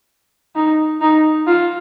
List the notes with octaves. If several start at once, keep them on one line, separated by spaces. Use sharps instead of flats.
D#4
D#4
F4